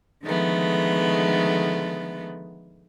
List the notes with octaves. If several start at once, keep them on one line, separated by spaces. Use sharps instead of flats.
D3 D#3 F3 G#3 A3 B3